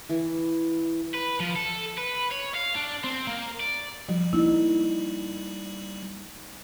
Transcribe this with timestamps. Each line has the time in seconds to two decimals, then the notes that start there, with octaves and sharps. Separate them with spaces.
0.09 E3
1.15 B4
1.40 F3
1.56 A4
1.98 B4
2.31 C#5
2.55 F5
2.76 D4
3.04 C4
3.27 A#3
3.60 D5
4.08 F3 G3
4.33 A#3 D#4 E4